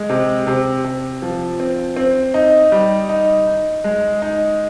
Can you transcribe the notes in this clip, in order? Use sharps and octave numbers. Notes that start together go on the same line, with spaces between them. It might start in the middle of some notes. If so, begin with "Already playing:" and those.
Already playing: G#3
C3
C3
C3
F3
C4
C4
D#4
G3
D#4
D#4
G#3
D#4